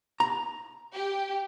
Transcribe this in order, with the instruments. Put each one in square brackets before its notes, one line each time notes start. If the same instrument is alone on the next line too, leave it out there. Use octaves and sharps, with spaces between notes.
[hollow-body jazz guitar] A#5
[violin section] G4